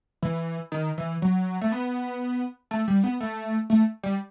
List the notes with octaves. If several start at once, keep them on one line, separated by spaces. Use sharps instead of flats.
E3
D#3
E3
F#3
A3
B3
A3
G3
B3
A3
A3
G3